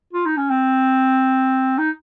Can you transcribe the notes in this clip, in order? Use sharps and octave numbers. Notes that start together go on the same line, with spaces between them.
F4
D#4
C#4
C4
D#4